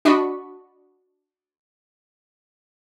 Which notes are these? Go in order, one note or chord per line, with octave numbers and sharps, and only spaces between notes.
D4 F#4 D#5 B5 C#6